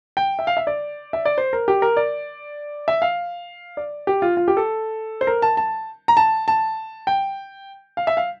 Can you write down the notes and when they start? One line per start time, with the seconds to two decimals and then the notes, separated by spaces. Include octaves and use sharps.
0.17 G5
0.39 E5
0.47 F5
0.57 E5
0.67 D5
1.13 E5
1.25 D5
1.38 C5
1.53 A#4
1.68 G4
1.82 A#4
1.97 D5
2.88 E5
3.02 F5
3.77 D5
4.07 G4
4.22 F4
4.37 F4
4.48 G4
4.57 A4
5.21 C5
5.27 A#4
5.42 A5
5.57 A5
6.08 A#5
6.17 A5
6.48 A5
7.07 G5
7.97 F5
8.07 E5
8.17 F5